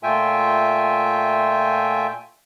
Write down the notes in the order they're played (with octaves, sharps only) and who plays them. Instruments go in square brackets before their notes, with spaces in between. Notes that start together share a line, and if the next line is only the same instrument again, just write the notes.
[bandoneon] A#2 A3 F4 E5 G5 G#5